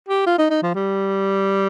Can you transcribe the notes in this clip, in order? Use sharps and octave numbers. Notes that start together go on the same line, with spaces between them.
G4
F4
D#4
D#4
F3
G3